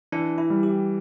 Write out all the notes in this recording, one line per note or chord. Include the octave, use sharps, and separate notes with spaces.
E3 D4
E4
G3
G4